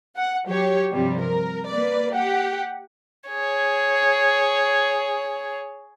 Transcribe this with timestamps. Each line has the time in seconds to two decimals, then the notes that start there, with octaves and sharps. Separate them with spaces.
0.16 F#5
0.47 F#3 G4 C#5
0.91 G2 C3 F3 G3
1.20 A#4
1.68 A#3 B4 D5
2.14 G4 F#5
3.29 G#4 C#5